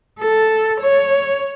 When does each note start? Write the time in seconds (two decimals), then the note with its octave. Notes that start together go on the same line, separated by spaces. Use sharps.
0.20 A4
0.81 C#5